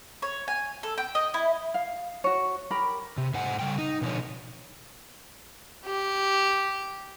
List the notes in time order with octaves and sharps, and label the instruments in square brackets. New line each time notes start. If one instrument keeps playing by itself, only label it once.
[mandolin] C#5
G#5
A4
G5
D#5
E4
[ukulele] F5
F#4 C#5
G4 A#4 B5
[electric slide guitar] C3
G#2 C5 F#5 G#5
C#3 G3 G5
D#4
B2 D3 F3 C#5
[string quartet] G4